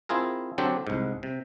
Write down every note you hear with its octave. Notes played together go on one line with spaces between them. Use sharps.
C4 E4 F4 G#4 A#4
D3 F#3 C4 D4 G4
C2 G#2
C3